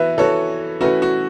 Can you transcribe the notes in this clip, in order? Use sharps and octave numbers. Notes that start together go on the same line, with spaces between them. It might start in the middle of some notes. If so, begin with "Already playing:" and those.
Already playing: E3 B3 F#4 B4 E5
E3 B3 F#4 A4 C#5
E3 A3 C#4 E4 F#4 B4
F#4